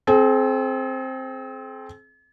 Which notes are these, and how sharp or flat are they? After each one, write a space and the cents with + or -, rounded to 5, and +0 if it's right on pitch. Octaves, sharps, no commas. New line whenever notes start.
C4 +5 G#4 +45